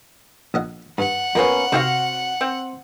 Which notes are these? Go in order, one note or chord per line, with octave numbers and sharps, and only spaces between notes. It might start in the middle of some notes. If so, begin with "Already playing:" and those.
A#1 D#5 F#5
G2 F#5
F2 A#3 B3 C#4
C3 C4 F#4 G4 F5
C4